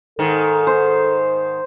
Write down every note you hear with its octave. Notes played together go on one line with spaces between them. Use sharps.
G#2 D#3 A4
C5